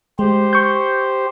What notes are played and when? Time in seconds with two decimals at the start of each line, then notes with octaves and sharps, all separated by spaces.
0.19 G#3 G4 C5
0.53 C#6 G6